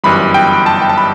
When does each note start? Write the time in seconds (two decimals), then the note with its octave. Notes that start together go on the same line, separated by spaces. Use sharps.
0.03 G1 F#2 E3 G3 B5
0.34 G5
0.66 A5
0.82 G5
0.89 A5
0.98 B5